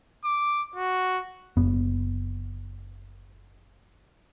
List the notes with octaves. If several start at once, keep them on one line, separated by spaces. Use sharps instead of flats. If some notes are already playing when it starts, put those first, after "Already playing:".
D6
F#4
F#1 B3